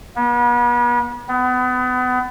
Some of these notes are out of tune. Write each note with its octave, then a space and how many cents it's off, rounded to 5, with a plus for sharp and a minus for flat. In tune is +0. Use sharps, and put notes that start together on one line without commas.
B3 -40
B3 +30